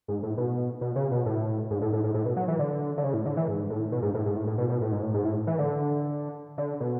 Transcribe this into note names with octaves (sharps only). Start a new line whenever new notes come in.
G#2
A2
B2
B2
C#3
B2
A2
G#2
A2
A2
A2
A2
B2
F#3
E3
D3
D3
C#3
A2
D3
E3
G#2
A2
B2
G#2
A2
G#2
A2
A2
B2
B2
A2
G#2
A2
G#2
A2
E3
D3
D3
B2